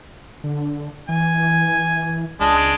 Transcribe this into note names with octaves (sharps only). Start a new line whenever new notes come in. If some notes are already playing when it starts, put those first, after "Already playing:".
D3
E3 G#5
C#2 G#3 D4